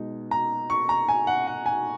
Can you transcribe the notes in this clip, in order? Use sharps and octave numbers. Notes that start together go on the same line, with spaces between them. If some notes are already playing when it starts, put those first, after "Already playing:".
Already playing: B2 G#3 D#4
A#5
C#6
A#5
G#5
F#5
F#5
G#5